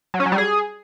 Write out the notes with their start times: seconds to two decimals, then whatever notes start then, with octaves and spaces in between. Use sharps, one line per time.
0.14 F#3
0.20 C#4
0.26 F#3
0.32 G3
0.38 G#4